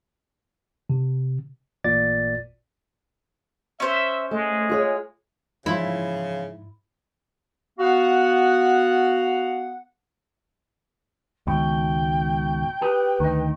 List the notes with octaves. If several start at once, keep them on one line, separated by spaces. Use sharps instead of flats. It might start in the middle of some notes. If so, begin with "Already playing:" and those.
C3
A1 A#2 D5 A6
C#4 C5 E5
G#3 A3
F4 G#4 C#5
G#2 C#3 E3 F3 E4 F4
B3 F#4 F5 F#5
C#2 G#2 B2 D#3 G5
G4 G#4 B4
D2 D#3 D#4